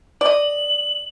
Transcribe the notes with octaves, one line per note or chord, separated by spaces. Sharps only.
D5 D#5 F#7